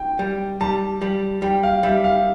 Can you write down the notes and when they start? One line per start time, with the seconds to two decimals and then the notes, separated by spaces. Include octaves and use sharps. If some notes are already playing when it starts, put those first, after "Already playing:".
Already playing: G5
0.19 G3
0.61 G3 A5
1.02 G3
1.42 G3 G5
1.63 F5
1.83 G3 E5
2.04 F5